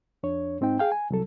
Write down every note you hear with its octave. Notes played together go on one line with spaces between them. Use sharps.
F2 D4 C#5
G#2 C4 D#4 G5
G#4 F5 G5
G#5
C2 F#3 A4